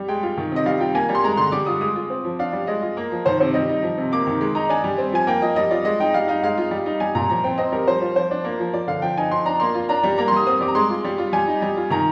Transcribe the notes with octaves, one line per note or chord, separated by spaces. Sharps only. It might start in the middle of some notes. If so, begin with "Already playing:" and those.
Already playing: G3
G#3 G5
F4
D#3
C3 D#5
G3 F5
F4 G5
A#3 G#5
G3
C6
G#3 A#5
D3 C6
G3 D6
F4 D#6
G#3 D#6
F4
C4
F3
D4 F5
G3
G#3 D#5
F4
A#3
F3
D#3 C5
C3 C5
G3 D#5
D#4
F3
C3
A#3 D6
D#3
G#3
D#4 A#5
D4 G#5
G3
C4
F3 G#5
A#3 G5
F3 D#5
G3 D#5
F4 D5
G#3 D#5
D#4 G5
G3 F5
D#4 F5
G#3 F5
F4
G3
D#4
G3 G#5
A#2 A#5
F3 A#5
C4 G5
C4 D#5
G3 A#4
F3 C5
F4
F3 C5
D4
A#3
F3
F3 D5
D3 F5
F3 G5
D#4 G#5
F3 C6
D4 A#5
A#3 C6
F4
D4 A#5
G3
A#3 A#5
C6
G3 D#6
C4 D#6
G3 D6
A#5
G#3 C6
F4
G3
F4
G3 G#5
D#4
G3
F4
D#3 A#5